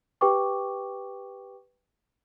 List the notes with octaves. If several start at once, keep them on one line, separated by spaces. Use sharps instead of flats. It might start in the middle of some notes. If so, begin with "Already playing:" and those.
G4 B4 G5 C#6 D6